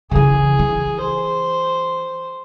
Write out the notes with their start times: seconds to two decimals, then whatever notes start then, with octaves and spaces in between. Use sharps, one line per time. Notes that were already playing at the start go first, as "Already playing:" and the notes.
0.11 C#3 E3 G#4
0.59 E3
1.01 C5